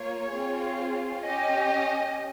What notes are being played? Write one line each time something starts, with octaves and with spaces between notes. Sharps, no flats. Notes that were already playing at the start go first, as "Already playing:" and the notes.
Already playing: A#3 F4 C#5
C4 F4 G#4
C#4 G4 D#5